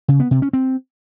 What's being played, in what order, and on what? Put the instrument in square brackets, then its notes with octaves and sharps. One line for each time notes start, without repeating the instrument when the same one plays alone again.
[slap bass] C#3
B3
C3
C#4
C4